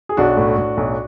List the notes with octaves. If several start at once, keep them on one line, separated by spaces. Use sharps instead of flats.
G#4
B1 D4 F#4
A2
A2
B1